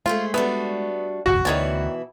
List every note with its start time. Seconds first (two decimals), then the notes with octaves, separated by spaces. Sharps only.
0.06 G#3 A3 F4 G#4 C5
0.34 G3 A3 B3 D4 F#4
1.26 G1 C2 F2 F#4
1.45 D2 B2 D#3 E3 E4 C#5 D5